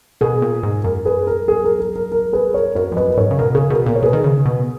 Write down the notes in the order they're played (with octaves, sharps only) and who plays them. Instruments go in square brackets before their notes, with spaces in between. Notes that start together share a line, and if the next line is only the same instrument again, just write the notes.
[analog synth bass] B2 [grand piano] G#4
[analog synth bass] A#2
G#2
[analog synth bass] F#2 [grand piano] A#4
[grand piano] G#4 B4
A#4
G#4
A#4
A#4
A#4
A#4
G#4 B4
A#4 C#5
[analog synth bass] F#2 [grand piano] A#4 C#5
[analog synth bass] F2
[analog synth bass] F#2 [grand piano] B4 D#5
[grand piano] B4
[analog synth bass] G#2 [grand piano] A#4 C#5
[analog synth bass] C#3
[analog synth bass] B2 [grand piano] A#4
[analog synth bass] C#3 [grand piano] G#4
[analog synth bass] B2 [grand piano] A#4
[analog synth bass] A#2 [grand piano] A#4
[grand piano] C#5
[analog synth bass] B2 [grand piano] G#4 B4
[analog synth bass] D#3
C#3
B2